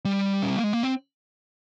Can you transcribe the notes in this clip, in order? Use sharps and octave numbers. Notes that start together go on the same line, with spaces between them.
G3
C#4
C4
A#3
G#3
A#3
C4